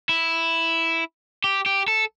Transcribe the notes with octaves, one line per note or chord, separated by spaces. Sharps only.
E4
G4
G4
A4